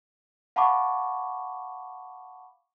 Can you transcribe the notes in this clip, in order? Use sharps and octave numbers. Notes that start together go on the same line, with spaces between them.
F5 F#5 A5 B5 C#6 D6